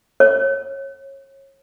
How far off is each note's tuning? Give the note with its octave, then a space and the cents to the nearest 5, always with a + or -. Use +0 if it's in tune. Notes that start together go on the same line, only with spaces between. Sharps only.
C#5 -30